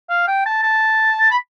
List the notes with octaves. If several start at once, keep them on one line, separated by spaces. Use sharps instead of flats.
F5
G5
A5
A5
B5